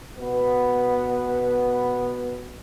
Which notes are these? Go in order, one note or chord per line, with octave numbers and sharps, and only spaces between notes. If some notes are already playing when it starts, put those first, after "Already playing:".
B2 B3